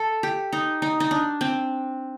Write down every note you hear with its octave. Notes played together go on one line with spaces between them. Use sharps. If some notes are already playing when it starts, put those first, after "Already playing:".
Already playing: A4
G4
D#4
D#4
D#4
D4
C4